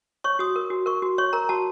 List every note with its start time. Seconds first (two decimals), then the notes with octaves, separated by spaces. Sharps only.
0.24 C#5 C#6
0.39 F#4 D#6
0.56 A#4
0.70 F#4
0.86 A#4 C#6
1.02 F#4
1.18 C#5 C#6
1.33 A#4 A#5
1.49 F#4 A5